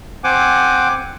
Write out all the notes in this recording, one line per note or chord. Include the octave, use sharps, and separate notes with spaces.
C4 C5 F#5 G#5 D6